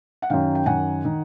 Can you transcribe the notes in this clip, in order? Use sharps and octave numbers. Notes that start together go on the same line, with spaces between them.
F#5
F#2 D#3 F5 G5
G5
F#2 D#3 F#5 G#5
D#3